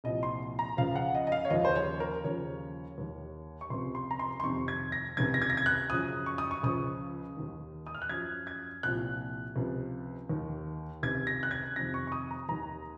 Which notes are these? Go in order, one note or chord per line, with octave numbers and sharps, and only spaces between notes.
C2 A#2 F3 D#5
C6
A#5
C#2 C#3 F3 F5
F#5
D#5
D#5
F5
C#5
D#2 C#3 F3 D#5
C5
C#5
A#4
D#2 C#3 F3 C#5
D#2 D#3
C#6
C#2 C3 F3 C6
C6
A#5
C6
C6
F2 C3 D#3 C#6
G#6
A#6
C#2 C3 D#3 G#6
A#6
G#6
A#6
G#6
F#6
F#2 C#3 F3 D#6
C#6
D#6
C#6
C#2 C#3 F3 D#6
D#2 D#3
D#6
F6
F#6
F#2 F3 G#6
G#6
C2 A#2 F3 F#6
C#2 C3 F3
D#2 D#3
C#2 C3 D#3 G#6
A#6
F#6
G#6
F2 C3 D#3 A#6
C#6
C#6
D#6
A#5
D#2 D#3 A#5